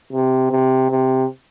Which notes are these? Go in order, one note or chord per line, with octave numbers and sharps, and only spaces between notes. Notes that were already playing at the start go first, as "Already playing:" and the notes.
C3
C3
C3